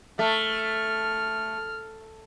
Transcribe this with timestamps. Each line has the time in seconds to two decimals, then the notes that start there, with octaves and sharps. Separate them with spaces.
0.19 A3 F6